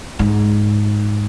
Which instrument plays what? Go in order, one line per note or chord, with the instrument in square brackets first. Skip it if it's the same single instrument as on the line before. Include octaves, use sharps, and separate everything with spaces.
[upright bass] G#2